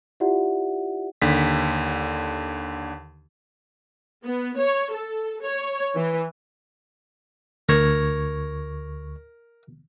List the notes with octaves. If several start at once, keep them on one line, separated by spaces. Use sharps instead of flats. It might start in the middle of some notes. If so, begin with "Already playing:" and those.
E4 F4 G4 D5 E5 F#5
D#2 D3 B6
B3
C#5
A4
C#5
E3
D2 A#4 C#6 G#6